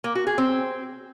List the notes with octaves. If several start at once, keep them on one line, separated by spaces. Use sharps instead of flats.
A#3
F#4
G#4
C4